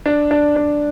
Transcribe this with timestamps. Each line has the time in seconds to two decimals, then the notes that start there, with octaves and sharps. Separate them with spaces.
0.06 D4
0.31 D4
0.56 D4